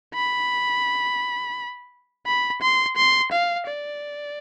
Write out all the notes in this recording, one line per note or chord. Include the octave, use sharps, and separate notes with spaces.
B5
B5
C6
C6
F5
D5